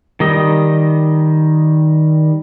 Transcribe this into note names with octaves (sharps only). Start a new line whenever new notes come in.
D#3 G3 D#5